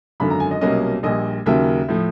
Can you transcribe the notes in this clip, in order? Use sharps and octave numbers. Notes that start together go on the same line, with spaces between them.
G#1 F#2 D3 B5
A#5
G#5
D#5
C2 B2 F#3 A#3 C#4 D#5
A#1 A#2 G3 D#5
D#2 C#3 F#3 A#3 E5
A2 F3